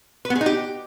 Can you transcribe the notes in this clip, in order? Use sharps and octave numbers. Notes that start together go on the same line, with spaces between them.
B4
B3
G#4
D#4
G4